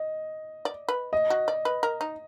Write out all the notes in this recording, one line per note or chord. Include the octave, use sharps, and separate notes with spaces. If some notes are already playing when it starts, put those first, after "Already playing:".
Already playing: D#5
D5
B4
D#5
F#4
D5
B4
A#4
D#4